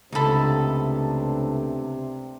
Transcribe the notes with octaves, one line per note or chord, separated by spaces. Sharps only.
C#2 C3 A3 B3 D4 D#4 A4 B5